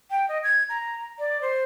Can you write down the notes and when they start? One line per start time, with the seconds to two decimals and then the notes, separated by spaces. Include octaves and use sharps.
0.11 G5
0.29 D#5
0.44 G#6
0.69 A#5
1.19 D5
1.42 C5